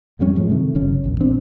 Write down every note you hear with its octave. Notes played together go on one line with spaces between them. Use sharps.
F2 F3 G3 C#4
F#2 A2 F3 G#3
C3 D#3 G#3 A3
G1 F#2 C#3 C#4
A#1 E2
D#1 A#1 C4 D4